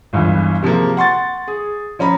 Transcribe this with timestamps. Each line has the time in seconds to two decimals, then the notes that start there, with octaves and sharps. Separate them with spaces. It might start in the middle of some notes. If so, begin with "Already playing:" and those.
0.13 G1 C#2 G2 E3
0.62 C3 F3 G#3 A#3
0.97 F#5 C6 C#6 A6
1.48 G#4
1.99 F3 C#4 A#5 B5